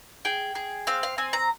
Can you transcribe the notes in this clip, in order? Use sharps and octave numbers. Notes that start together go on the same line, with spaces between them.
G#4 G5
G#4
C4 F5
F5
C4 G#5
A#5